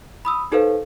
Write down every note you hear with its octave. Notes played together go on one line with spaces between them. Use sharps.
B5 D#6 E6
D#4 G4 A4 B4 C5 F5